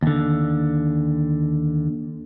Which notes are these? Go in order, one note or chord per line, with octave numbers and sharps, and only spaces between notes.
D#2 D3